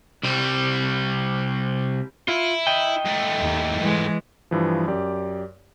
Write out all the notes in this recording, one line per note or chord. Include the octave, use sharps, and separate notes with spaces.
C2 G3
E4 F4
D#5 G5
G#2 A3
D#2
E3 G#3
G2 E3 F3
F#2 G4 D5